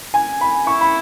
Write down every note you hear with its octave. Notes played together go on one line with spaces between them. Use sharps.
G#5
B5
E4 C#6
B5